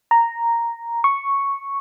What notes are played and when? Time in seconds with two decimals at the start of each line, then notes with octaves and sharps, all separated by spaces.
0.11 A#5
1.04 C#6